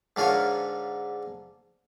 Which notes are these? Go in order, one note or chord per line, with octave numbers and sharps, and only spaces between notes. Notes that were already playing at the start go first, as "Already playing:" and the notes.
G#2 D3 F4 A#4 C#5